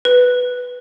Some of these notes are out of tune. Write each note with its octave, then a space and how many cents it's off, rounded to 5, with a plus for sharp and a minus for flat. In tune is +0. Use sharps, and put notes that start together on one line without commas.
B4 +5